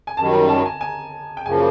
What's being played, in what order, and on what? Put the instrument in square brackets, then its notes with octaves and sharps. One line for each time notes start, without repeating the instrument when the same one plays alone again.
[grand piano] G#5
[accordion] F#2 [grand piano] A5
[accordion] D#3 G3
[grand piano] A#5
A5
G#5
G#5
G5
[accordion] F#2 C#3 F3 A#3 [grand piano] G#5